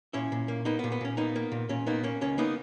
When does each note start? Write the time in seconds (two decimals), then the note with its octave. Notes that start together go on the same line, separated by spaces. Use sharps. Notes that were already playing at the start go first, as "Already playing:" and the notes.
0.13 A#2 C#4 E4
0.32 A#2
0.48 A#3
0.65 A#3 B3 D#4
0.79 B3
0.84 A#2
0.92 B3
1.01 A#2 C#4
1.17 A#3 B3 D#4
1.36 A#3
1.52 A#2
1.69 A#2 C#4
1.86 A#3 B3 D#4
2.03 A#3 C#4
2.21 C#2 C#4
2.38 A#3 B3 D#4